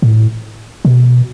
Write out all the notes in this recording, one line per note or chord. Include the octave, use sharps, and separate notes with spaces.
A2
B2